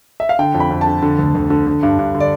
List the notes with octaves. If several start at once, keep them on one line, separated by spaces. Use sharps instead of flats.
E5
F5
D3 G5
F2
B5
F2
A5
D3
D3
D2
D2
D3
D3
G2
G2
D3
D5